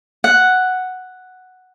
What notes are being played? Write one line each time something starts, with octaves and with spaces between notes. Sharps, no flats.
F#5